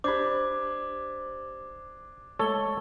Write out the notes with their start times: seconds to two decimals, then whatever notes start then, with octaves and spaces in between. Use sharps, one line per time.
0.04 D4 G4 C5 B5 D6 G#6
2.39 G#3 A3 A4 C#5 G7